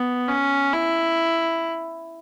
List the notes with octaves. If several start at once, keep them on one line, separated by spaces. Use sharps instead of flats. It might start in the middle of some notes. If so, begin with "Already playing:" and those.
Already playing: B3
C#4
E4